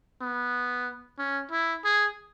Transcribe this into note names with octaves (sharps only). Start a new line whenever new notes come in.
B3
C#4
E4
G#4